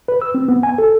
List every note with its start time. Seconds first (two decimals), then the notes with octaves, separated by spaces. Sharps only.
0.08 B4
0.22 E6
0.34 C4
0.48 B3
0.63 G#5
0.78 A4